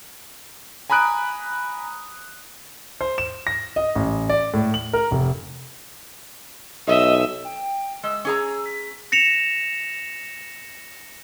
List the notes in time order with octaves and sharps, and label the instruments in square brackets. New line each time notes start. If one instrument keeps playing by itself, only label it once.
[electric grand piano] G#5 A#5 B5 D#6 F#6 D7
[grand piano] C5
E7
A#6
D#5
A1
D5
A2
F#7
A#4
F1
[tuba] B1 [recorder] D#5 [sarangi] E5
[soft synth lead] G5
[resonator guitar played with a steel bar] G#3 [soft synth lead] E6
[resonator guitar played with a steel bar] C#4 G#4 A#5
[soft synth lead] B6
[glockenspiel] A#6 C#7 E7 F7